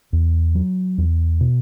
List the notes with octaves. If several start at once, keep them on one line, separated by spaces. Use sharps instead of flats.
E2
F#3
E2
B2